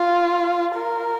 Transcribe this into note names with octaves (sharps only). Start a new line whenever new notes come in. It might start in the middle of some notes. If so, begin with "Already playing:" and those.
Already playing: F4
A#4